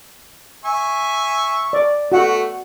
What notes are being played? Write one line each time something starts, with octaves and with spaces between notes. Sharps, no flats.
E5 G#5 C#6
D5
A3 F#4 F#5